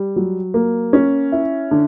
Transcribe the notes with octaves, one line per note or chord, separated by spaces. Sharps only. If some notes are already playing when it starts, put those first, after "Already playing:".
Already playing: G3
F#3
A#3
C#4
E4
D3